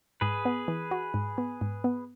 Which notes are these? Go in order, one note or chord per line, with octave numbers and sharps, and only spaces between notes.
G#2 G#4 B4
B3
E3
F#4
G#2
B3
G#2
B3